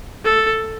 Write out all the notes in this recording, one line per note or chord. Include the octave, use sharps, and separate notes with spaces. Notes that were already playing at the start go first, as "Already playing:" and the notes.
A4